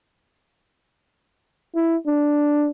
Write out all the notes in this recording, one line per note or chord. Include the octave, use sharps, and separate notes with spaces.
E4
D4